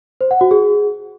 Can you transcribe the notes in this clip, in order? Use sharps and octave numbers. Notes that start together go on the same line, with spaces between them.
C5
F#5
F#4
G#4